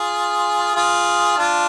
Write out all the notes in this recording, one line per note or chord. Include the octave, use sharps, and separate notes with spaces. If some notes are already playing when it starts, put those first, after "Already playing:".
Already playing: F4 G#4
F4 G#4
D4 F4